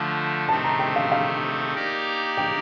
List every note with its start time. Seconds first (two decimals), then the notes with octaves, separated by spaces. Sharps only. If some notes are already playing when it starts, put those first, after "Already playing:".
Already playing: D3 F3 A3
0.48 C3 D#3 A3 C4 A5
0.64 A#5
0.79 G5
0.96 F5
1.12 F5
1.74 A#3 D#4 G4 A#4 D5
2.37 G5